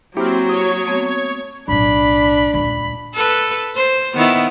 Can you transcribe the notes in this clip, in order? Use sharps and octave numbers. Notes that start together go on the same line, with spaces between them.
F#3 A#3 C4 E4 G4 F6
C#5 D#6 G#6
A3 B3 C4
B1 A2 D4 B5
D#1 C#2 B5
A4 B4
C5
D#3 B3 E4